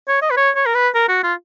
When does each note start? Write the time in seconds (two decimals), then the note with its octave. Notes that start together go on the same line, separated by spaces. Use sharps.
0.08 C#5
0.22 D#5
0.31 B4
0.37 C#5
0.56 C#5
0.66 A#4
0.75 B4
0.95 A#4
1.09 F#4
1.23 F4